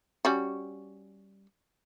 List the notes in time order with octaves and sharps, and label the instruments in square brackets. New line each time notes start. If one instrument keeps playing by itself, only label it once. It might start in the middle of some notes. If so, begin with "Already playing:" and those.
[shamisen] G3 C#4 F#4